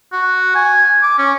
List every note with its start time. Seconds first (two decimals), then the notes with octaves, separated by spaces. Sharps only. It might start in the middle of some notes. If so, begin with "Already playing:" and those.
0.12 F#4
0.55 G#5
1.03 D6
1.18 C#4